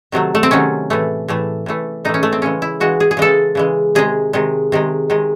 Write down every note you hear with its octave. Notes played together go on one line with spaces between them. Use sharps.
C3 D#3 F#3 A3
A3
C4
C3 D#3 F#3 A3 C#4
A2 E3 A3
A2 E3 A3
A2 E3 A3
A2 E3 A3 D#4
C#4
A3
C4
C#3 E3 G#3 C#4
E4
C#3 E3 G#3 F#4
G#4
G#4
C#3 E3 G#3 A4
C#3 E3 G#3
C3 D#3 G#3 G#4
C3 D#3 G#3
C3 D#3 G#3
C3 D#3 G#3